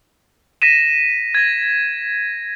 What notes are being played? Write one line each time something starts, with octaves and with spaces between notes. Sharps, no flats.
A#6 B6 D#7 E7
G#6 A#6